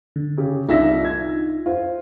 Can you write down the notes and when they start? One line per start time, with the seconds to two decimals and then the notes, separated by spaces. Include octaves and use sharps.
0.16 D3
0.37 C#3 G4
0.69 C2 D4 D#4 F4 E5 A#6
1.05 G#6
1.66 F4 C5